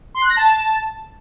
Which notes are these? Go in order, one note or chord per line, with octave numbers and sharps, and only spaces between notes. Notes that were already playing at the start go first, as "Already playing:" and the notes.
C6
F#6
A#6
A5